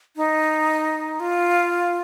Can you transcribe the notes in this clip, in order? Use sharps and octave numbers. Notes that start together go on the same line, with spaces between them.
D#4
F4